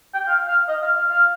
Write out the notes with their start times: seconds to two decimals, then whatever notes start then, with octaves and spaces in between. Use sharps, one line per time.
0.14 G5
0.27 F5
0.48 F5
0.68 D#5
0.82 F5
0.96 F5
1.09 F5